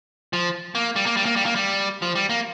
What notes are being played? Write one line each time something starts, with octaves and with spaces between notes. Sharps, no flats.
F3
A#3
G3
A#3
G3
A#3
G3
A#3
G3
F3
G3
A#3